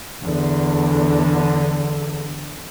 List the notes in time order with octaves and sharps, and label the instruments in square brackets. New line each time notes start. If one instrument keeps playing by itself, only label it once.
[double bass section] E2 D3